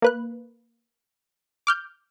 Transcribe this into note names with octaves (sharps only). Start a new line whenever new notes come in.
A#3 B4 F#6
D6 F6 G6